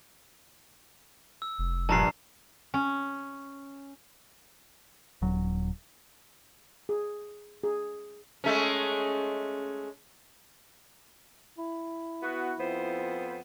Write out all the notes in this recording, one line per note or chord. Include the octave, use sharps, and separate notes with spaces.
E6
F1
A#1 G2 A5 A#5 C7
C#4
D#1 F#3
G#4
G#4
G#3 A3 C#4
E4
B3 F#4
F2 B3 C5